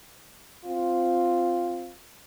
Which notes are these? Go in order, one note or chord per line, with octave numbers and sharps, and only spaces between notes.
C4 F4